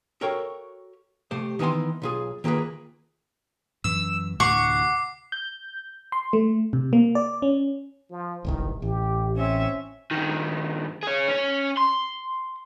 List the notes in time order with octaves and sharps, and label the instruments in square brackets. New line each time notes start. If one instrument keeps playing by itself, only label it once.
[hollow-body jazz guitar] F#4 A4 A#4 C#5 F5 G5
C3 A3 G4 C5
D#3 E3 B3 G#5 C6
B1 F4 G#4
D#3 A#3 F4 G#4 B4
[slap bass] F#2 E3 [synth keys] E6
[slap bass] D2 A2 C3 [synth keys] F#5 [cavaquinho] C#6 [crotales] D6 C7
[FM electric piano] G6
C6
A3
C3
A#3
D5
C#4
[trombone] F3
[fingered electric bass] D1 G1 C2 [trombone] D#3
[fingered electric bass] A1 [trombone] G4
[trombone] C4 [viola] C#4 E5
[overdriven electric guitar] G2 D#3
G#4 C#5
C#4 C#5
C6